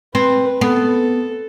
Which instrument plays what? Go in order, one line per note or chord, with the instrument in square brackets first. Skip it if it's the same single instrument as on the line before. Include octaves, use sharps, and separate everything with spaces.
[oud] C4 [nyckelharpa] B4
[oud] B3 [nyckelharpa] A4